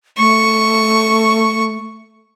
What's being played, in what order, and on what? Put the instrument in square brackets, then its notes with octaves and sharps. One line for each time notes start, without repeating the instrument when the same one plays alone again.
[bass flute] A3 [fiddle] C#6